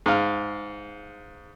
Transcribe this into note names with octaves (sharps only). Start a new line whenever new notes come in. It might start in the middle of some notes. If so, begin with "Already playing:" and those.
G#2 F5